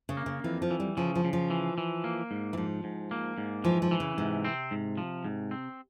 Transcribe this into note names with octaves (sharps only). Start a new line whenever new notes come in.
C#3
A#3
C#3
F2 E3
F3
E3
G3
C#3 F3
F3
C#3
F3
E3
E3
A#3
G#2
E3
G#2 F3
G#2
A#3
G#2
E3 F3
F3
E3
C#3
G#2 C3
C4
G#2
F3
G#2
C4